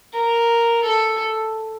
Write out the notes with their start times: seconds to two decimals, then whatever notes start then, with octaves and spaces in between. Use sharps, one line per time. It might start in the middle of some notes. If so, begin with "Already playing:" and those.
0.13 A#4
0.83 A4